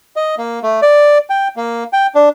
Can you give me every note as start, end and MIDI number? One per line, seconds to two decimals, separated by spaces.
0.16 0.35 75
0.38 0.59 58
0.63 0.80 57
0.82 1.18 74
1.30 1.48 79
1.57 1.84 58
1.93 2.07 79
2.15 2.29 62